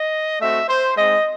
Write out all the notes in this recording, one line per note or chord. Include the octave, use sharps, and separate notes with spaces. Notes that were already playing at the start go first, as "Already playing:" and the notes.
Already playing: D#5
A3 C4 F#4 E5
C5
G#3 C4 D#4 D#5